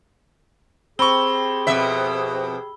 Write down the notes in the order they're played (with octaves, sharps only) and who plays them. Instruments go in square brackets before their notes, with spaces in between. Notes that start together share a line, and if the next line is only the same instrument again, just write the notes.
[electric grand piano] C4 C#6 [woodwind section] G4 G#4 [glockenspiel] B5 E6 G7
[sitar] F2 B2 E5